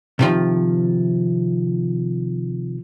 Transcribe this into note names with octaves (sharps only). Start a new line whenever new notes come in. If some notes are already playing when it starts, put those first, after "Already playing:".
C3 D#3 F3